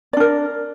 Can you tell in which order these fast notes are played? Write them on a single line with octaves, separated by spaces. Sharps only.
D5 D4 A#4